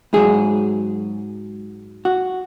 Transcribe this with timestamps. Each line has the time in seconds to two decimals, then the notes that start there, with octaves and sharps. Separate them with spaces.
0.13 G#2 F#3 G#4
2.05 F#4